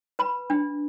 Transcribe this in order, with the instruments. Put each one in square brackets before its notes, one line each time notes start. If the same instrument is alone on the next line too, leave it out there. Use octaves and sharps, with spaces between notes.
[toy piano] B4 B5
D4